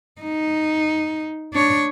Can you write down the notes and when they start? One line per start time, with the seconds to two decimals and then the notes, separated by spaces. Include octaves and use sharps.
0.21 D#4
1.53 D4 C#5